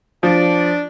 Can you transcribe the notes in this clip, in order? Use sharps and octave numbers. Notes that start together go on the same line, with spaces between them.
F3 D4